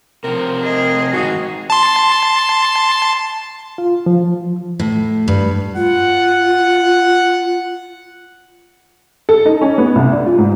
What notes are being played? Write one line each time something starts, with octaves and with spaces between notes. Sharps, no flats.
C3 F3 A#4
G#4 D#5
G#2 D#3 F#4
A5 C6
F4
F3
A2
G2
F4 F#5
A4
D#4
C#4
B3
C2
D4
F4
G#2